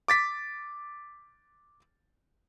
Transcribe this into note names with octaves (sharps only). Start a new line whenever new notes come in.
D6 A6 B6